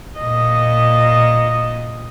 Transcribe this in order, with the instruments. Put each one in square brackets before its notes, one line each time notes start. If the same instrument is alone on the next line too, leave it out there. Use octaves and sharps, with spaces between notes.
[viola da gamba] A#2 D#5